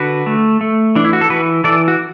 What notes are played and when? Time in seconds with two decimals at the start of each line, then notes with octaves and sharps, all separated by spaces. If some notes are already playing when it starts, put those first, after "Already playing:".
Already playing: D3 F#4 B4
0.26 A3
0.61 A3
0.95 E3 D4
1.05 E4
1.13 F#4
1.21 A4
1.30 E3 F#4 B4
1.64 E3 A4 D5
1.88 F#4